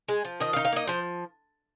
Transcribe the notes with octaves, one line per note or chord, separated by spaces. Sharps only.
G#3
F3
D#3 D#5
F5
D#4
F5
A#3 D#5
F3 C5